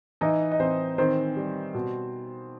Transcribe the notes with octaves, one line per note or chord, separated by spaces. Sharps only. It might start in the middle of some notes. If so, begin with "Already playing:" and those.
E3 D#4 D#5
D#5
E3 C4 C5
D#3 C4 C5
G3
B2